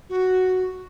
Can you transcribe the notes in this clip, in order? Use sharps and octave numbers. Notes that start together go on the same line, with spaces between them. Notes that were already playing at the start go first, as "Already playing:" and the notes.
F#4